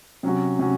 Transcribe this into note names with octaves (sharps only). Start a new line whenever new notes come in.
C3 F#3 C#4 F#4
C3 F#3 C#4 F#4